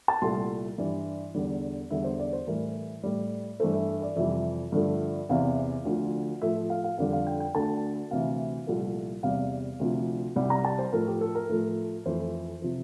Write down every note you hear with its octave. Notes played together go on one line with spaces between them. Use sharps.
A5
C2 A#2 A3 C6
G2 E3 G3
E2 D3 G3
E2 D3 G3 E5
C5
D5
C5
A2 E3 G3 A#4
A2 G3
G2 E3 A3 C5
E5
E5
D5
F2 C3 E3 G3 E5
G2 D3 F3 A3
E2 C3 E3 F5
D2 D3 F3
A2 F3 A3 E5
F5
F5
F2 D3 G3 F5
F5
G5
G5
D2 D3 A3 A5
D2 C3 E3 F5
C2 A#2 F3 A3
E2 C3 G3 F5
D2 C3 F3
C2 C3 G3
A#5
A5
C5
A2 F3 A3 A#4
G4
A4
A#4
A2 F3 A3
F2 E3 A3 C5
C3 F3